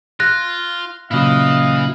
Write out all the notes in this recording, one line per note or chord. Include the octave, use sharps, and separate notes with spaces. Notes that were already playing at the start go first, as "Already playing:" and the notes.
F4 F#6 A#6
A#2 C#3 F#3 E4 B4 D#5 F5